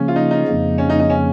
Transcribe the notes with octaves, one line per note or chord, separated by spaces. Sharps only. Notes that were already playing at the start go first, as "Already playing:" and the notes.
Already playing: C#3 F3 A#3 C#4
F4
D#4
D#4
F2 C#3 F3 A#3
C#4
D#4
D#4
C#4